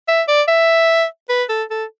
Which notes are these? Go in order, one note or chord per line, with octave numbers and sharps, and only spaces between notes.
E5
D5
E5
B4
A4
A4